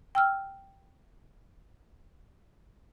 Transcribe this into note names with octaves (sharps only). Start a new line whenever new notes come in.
G5 E6 F6